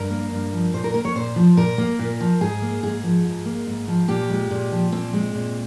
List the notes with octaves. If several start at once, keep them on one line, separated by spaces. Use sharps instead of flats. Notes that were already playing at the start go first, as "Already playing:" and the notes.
Already playing: G2 A#4
A#3
G2
F3
A#2 C5
A#4
A#3 A#4
C#5
A#2 C5
F3
A#2 A#4
A#3
A#2
F3
G#2 G#4
A#3
G#2 G#4
F3
G#2
A#3
G#2
F3
A#2 G4
G#3
A#2
F3
A#2 C4
G#3
A#2